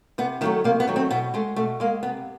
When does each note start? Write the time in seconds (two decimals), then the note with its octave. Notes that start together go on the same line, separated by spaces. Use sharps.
0.18 C3 B3
0.41 D#3 F#3 A3 B3
0.64 C3 A#3
0.80 B3
0.87 D#3 F#3 A3
0.96 C4
1.11 B2 B3
1.34 G#3 A3
1.56 B2 A3
1.80 G#3 A#3
2.03 C3 B3